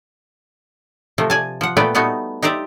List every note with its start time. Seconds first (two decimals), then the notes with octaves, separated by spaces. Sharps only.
1.18 C3 F3 A3
1.30 D5 G#5 A5
1.61 F3 F#5
1.77 A#2 A3 B3 B4 D5 G5
1.95 G3 A3 B3 D#4 F#4
2.42 D#4 G4 C5 D5 E5